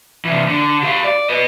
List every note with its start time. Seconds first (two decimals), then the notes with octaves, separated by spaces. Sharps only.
0.25 C3 E3
0.48 D3
0.83 G4 F5
1.04 D5
1.30 B4 D#5